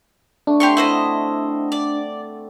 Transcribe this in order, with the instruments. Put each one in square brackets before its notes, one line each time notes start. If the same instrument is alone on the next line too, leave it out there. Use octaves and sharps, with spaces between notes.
[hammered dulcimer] A3 [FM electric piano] D4
[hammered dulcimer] C4 F#4 C#5 [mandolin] G4 C6 C#6
[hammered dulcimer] D3 F#4 [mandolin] E4 C5 D#5
[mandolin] D5